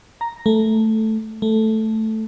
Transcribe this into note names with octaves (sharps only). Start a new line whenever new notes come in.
A#5
A3
A3